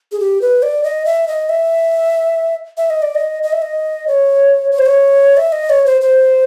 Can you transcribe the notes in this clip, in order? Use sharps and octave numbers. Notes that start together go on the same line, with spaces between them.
G#4
G4
B4
D5
D#5
E5
D#5
E5
E5
D#5
D5
D#5
D#5
E5
D#5
C#5
C#5
C5
C#5
E5
D#5
C#5
C5
C5